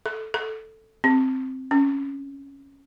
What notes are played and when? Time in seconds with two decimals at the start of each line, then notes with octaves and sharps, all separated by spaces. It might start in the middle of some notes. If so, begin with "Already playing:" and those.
0.06 A4
0.34 A4
1.04 C4
1.71 C#4